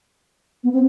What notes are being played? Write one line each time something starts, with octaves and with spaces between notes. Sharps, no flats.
B3
C4